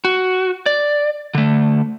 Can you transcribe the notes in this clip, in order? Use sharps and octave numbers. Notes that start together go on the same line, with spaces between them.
F#4
D5
D3 A3